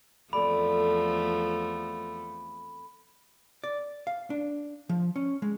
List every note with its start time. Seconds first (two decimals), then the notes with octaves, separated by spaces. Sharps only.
0.33 E2 F3 A3 C4 A4 D5 B5
3.64 D5
4.07 F5
4.30 D4
4.89 F3
5.16 C#4
5.42 G#3